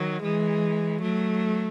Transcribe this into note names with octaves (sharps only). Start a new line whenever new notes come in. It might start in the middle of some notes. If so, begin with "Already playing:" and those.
Already playing: D#3 F#3
E3 G#3
F#3 A3